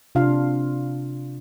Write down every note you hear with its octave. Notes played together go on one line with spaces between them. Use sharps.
C3 D4 F4 F5